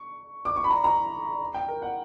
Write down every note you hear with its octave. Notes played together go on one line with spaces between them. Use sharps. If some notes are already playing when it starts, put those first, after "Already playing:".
Already playing: C#6
D6
C#6
B5
A#5
A#5
G5
A#4
F#5